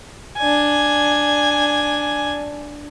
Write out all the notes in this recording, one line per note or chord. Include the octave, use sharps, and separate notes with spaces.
D4 G#5